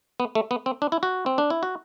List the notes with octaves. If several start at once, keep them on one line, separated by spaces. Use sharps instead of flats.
B3
A3
B3
C4
D4
E4
F#4
C4
D4
E4
F#4